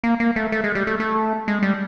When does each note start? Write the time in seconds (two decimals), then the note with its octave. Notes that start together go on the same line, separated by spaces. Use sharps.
0.04 A#3
0.20 A#3
0.36 A3
0.52 A3
0.64 G#3
0.75 G3
0.87 A3
1.00 A3
1.48 G#3
1.62 G3